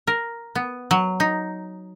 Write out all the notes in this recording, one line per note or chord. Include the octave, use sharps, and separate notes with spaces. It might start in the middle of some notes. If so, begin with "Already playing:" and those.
A#4
B3
F#3
D#4